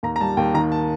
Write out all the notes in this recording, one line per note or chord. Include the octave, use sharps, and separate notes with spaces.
D#2 A#5
A#5
G3 A5
D#2 G5
D#3 A#5
A5